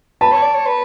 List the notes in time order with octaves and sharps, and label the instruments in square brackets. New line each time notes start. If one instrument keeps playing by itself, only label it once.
[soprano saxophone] B4 [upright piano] A5
[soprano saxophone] C#5
D5
C#5
B4